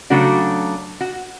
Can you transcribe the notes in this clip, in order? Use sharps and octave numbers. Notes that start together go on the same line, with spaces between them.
C#3 F#3 A3 D4 F#4
F#4